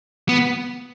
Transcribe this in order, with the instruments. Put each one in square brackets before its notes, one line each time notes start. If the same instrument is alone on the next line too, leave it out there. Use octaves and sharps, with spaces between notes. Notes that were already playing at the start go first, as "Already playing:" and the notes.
[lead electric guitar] B3